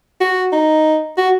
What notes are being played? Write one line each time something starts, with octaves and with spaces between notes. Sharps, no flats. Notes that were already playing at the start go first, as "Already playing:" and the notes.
F#4
D#4
F#4